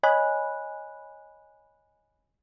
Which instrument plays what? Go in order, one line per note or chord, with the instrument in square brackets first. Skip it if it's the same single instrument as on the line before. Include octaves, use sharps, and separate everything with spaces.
[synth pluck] C#5 D#5 G#5 B5 F#6